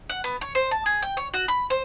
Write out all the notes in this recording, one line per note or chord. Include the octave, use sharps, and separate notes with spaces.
F#5
B3
C#5
C5
A5
G#4
G5
C#5
F#4
B5
C5